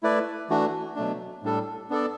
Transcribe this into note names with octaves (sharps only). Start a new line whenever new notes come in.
A3 E4 B4 D5
E3 A3 D4 F#4
B2 F#3 A3 D4
A2 G3 D4 A4
B3 D4 A4 D5